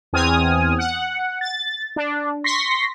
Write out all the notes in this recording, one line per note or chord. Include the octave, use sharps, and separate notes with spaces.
E2 C4 G#5 D#6 F6
F#5
A6
D4
C6 C#6 A#6 B6